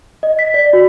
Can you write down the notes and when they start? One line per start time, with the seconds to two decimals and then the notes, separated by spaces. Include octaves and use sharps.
0.23 D#5
0.39 B6
0.54 D5
0.73 F#4